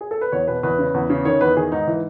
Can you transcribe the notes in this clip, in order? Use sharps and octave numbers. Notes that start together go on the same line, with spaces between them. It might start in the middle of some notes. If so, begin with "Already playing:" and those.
G#4
A4
B4
E2 C#5
B2 B4
E2 B4
C#3
E2
C#3
D#3 C#5
E2 B4
D#3 G#4
G#2 D#4
E3